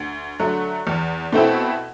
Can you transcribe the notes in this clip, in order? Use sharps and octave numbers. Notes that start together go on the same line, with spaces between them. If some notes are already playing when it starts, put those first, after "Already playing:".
Already playing: D2
D3 F#3 A3
E2
B2 A3 C4 E4